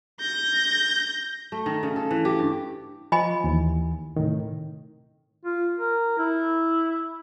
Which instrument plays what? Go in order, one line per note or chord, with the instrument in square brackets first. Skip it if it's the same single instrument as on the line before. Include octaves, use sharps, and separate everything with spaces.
[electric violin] G6 A#6
[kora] A3
D#3
C#3
A4
E3
G4
G2
[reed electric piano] F3 [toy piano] D#5 G#5 B5
[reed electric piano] D#2 E3
A2 C3 D#3
[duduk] F4
A#4
E4